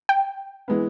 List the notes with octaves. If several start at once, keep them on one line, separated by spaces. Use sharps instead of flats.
G5
E3 G#3 B3